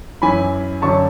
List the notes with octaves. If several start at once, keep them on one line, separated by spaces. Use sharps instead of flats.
F#2 E3 G#5 B5
F#2 D3 F#3 A5 C#6